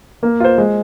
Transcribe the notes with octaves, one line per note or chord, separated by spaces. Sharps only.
A#3
F4 C5
G#3